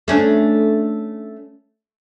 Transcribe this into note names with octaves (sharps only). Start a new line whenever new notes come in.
A3 C#4 D4